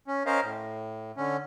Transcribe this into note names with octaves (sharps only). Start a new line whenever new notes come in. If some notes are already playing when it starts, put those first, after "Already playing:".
C#4
C#4 A#4 C5 D#5 F5
A2
D3 C#4